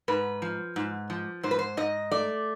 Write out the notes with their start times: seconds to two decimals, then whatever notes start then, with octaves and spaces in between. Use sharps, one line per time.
0.08 G#2 B4
0.42 F3
0.76 G#2
1.10 F3
1.43 G#2 C5
1.51 B4
1.59 C5
1.77 G#2 D#5
2.11 A3 D5